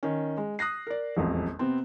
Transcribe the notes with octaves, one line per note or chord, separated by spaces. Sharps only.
D#3 C#4
G#3
D#6 F#6 A#6 C7
A#4 D5
E1 A1 F2
C3 B3 C4